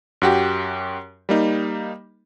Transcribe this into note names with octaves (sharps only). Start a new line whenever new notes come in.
F#2 F#4 G4
G3 A#3 D#4